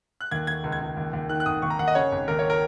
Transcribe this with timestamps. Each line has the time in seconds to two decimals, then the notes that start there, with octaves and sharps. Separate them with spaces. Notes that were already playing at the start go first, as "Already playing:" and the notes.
0.21 F#6
0.31 D#2 G#6
0.47 D#2 G#6
0.64 C#2
0.72 G#6
0.81 C#2
0.97 D#2
1.13 D#2
1.29 D#3 F#6
1.40 F#6
1.46 G#1 D#6
1.62 D#2 C#6
1.70 A#5
1.79 D#2 F#5
1.88 D#5
1.95 C#3 C#5
2.12 G#1
2.28 D#2 A#4
2.39 C#5
2.50 A#4